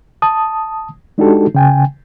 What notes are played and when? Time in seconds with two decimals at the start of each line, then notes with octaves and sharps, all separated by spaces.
0.22 A5 D#6
1.18 G#3 D4 D#4 F#4 G4 A4
1.55 C#3 G5 G#5